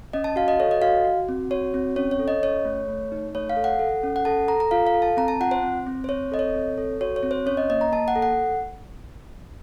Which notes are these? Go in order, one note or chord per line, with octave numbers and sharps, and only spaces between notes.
C#4 D#5
A5
F#4 F5
D#5
A4 C#5
D#5
F#4 F5
F#4
C4
F#4 C#5
C4
C#4 C#5
C#5
A4
D#5
C#4 C#5
A3
A3
D#4
A3 C#5
F5
A4
F#5
A4
C#4
F#5
A4 A5
A4 A#5
A#5
F4 F5
F5
A4
A5
C4 A#5
A5
F4 F#5
C5
C4
C4
C5
C4 C#5
A4 D#5
C#5
C4
A4
F#4 C#5
C#5
C4
C5
C#4 C#5
D#5
A#3 D#5
A#5
A#3 A5
F#5
A4
F#5